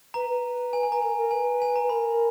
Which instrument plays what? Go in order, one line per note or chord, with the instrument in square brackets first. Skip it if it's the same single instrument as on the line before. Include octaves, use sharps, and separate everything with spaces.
[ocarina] B4 [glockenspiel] A#5
[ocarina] B4
[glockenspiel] G#5
G#5
[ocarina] B4 [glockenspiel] A#5
[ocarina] A#4 [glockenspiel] G#5
[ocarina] A#4
[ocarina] B4 [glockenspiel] G#5
[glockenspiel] G#5
A#5
[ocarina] B4
[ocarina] A#4 [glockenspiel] B5